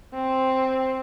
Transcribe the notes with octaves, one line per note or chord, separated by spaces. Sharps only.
C4